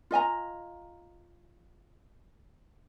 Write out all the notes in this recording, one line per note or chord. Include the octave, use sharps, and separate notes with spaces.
F4 D#5 G#5 A#5